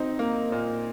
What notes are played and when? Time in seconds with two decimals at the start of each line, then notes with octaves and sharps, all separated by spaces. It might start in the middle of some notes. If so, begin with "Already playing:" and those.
Already playing: C4 D#4
0.19 A#3
0.52 A#2